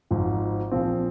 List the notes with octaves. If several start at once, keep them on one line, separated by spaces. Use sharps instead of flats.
G#1 G#2 F3
A#1 A#2 F3 C4